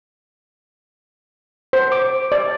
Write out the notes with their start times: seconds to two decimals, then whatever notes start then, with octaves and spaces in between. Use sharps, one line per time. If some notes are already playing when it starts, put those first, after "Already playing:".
1.73 C5
1.92 D6
2.32 D5